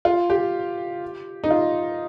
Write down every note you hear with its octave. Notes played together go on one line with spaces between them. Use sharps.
F4
G4
D#4
F4